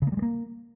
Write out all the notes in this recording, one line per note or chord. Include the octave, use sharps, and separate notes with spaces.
C#3
A#3
G3
G#3
A#3